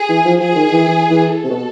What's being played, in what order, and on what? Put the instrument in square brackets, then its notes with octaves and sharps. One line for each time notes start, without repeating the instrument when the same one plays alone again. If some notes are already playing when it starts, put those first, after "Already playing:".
Already playing: [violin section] G#4
[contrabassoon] E3
F3
[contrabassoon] F3 [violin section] G#4
[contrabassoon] D#3
E3
E3
E3
[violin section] A4
[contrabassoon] C3
B2